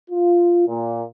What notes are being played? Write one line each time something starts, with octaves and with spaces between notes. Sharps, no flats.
F4
A#2